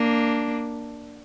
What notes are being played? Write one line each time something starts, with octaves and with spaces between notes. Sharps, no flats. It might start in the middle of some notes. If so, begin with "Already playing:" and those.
Already playing: A#3 D4